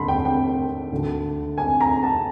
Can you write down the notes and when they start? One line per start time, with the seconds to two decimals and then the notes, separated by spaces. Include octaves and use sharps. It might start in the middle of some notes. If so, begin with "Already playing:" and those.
Already playing: D#2 D3 B5 C6
0.08 G5
0.25 G5
0.92 D2 D3
1.58 G#5
1.81 A#5
2.03 A5